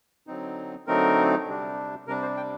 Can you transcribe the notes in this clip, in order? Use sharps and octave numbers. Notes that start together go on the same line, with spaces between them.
D3 F#3 C4 D#4
D3 F#3 A3 C4 D#4 A#4
C3 G3 D4
C3 G3 D4 A#4
C5
G5